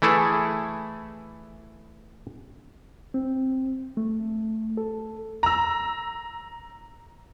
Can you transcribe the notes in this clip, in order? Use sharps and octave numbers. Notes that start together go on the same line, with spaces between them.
E3 A3 E4 G#4 A4
C4
A3
A4
A#5 E6